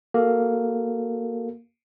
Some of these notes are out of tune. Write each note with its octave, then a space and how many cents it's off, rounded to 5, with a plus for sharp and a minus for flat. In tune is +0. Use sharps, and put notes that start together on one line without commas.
A#3 +0 F#4 +15 A4 +0